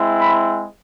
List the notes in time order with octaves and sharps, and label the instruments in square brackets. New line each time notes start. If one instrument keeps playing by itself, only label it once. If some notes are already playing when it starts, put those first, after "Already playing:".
Already playing: [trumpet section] G#3 C4 E4
B5